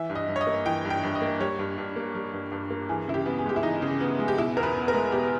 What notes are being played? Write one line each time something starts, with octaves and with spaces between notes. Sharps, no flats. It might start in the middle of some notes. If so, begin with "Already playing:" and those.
Already playing: E3 E5
G2
D#5
G2
C#5
D#5
A#3
E3 G5
G2
G5
G2
D#5
A#3
G3 C#5
G2
G2
A#3
G3
G2
G2
A#3
E3 G#4
C#3 E4
G4
B3
G#4
G#3 G4
E4
E3 D#4
C#3
B3
G#3
G4
B2 E4
E2 A#4
B4
B3
A#4
G#3
B2 G4